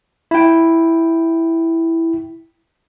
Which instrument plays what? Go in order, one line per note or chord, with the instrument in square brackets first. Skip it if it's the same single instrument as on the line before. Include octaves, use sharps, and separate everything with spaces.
[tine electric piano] E4 G5